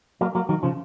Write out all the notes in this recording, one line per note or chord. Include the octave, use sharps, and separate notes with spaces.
F#3 A#3
F#3 A#3
D#3 F#3
C#3 F3